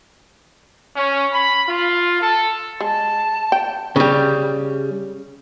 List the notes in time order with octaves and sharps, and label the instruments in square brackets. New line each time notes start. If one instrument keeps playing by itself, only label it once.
[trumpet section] C#4
B5
F4
A4
[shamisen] G#3 [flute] A5
[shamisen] G5
[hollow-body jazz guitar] C#3 G3